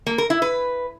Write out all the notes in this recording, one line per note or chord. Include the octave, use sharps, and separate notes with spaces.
A#3
A#4
E4
B4